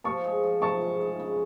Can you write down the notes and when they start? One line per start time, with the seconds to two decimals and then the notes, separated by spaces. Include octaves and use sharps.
0.04 F3 A5 C#6
0.24 G#3
0.43 F3
0.62 F3 A5 C#6
0.81 G#3
1.01 G#3
1.20 C#3